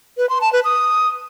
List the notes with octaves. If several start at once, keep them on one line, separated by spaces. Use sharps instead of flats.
B4
C6
A5
B4
D#6